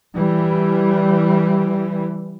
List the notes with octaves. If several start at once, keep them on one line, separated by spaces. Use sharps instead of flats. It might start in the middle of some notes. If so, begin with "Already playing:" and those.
E3 G3